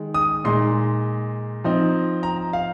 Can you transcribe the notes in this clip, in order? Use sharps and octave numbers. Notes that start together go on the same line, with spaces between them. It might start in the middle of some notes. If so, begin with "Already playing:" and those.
Already playing: D#3 G#3
D#6
A#2 G#3 D#4 C6
F3 C4 D#4
A#5
F5